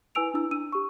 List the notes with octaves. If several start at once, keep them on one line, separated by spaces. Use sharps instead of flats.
E4 B4 G#5 E6 D7 F7
D4 E4 E6
D4 E6 D#7
G4 C#6